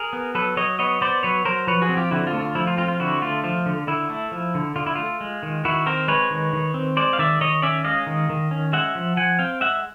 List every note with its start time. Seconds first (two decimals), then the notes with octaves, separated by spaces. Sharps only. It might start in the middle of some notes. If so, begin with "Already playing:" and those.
Already playing: G#4 A#4
0.13 B3
0.35 F#3 A4 B4
0.57 F#3 C#5 D#5
0.79 B3 C#5 D#5
1.01 B3 C5 D5
1.23 F#3 B4 C#5
1.45 F#3 A#4 C5
1.67 F3 B4 C#5
1.82 F#4 G#4
1.89 C4
1.97 F4 G4
2.11 D3 E4 F#4
2.27 F4
2.33 A3
2.41 F4
2.55 F3 E4
2.67 F4
2.77 C4 F4
2.88 F4
3.00 D3 E4 F#4
3.22 A3 F4
3.44 F3 F4
3.66 D3
3.87 D3 E4
4.10 A3
4.32 F3
4.55 D3
4.76 D3 F4
4.87 E4
4.95 A3 F4
5.21 G#3
5.43 D#3
5.65 D#3 E4 F#4
5.86 C4 A#4 C5
6.08 G#3 B4 C#5
6.30 D#3
6.53 D#3
6.74 C4
6.97 G#3 C5 D5
7.13 F5
7.19 D#3 D5 E5
7.41 D#3 C#5 D#5
7.62 C#4 D5 E5
7.84 G#3 D#5 F5
8.07 D#3
8.29 D#3
8.51 C#4
8.73 G#3 E5 F#5
8.95 F3
9.17 F3 F#5 G#5
9.39 C4 F5 G5
9.61 G#3 E5 F#5